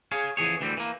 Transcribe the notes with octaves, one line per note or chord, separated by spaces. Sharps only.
G#4 C#5 F5
F2 E3 G#4 C#5
D2 E3 G3 C4
E3 A#3